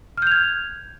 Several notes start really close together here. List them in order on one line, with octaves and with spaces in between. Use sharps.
F6 G6 F7 G#6